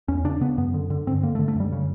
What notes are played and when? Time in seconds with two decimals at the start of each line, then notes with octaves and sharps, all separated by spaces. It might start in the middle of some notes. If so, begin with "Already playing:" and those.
0.08 E2 C#4
0.24 C#3 D4
0.41 C#3 B3
0.58 F#2 B3
0.74 D3
0.90 D3
1.07 G2 C4
1.23 D3 A#3
1.35 A3
1.39 D3
1.48 A3
1.55 F#2 G3
1.72 C#3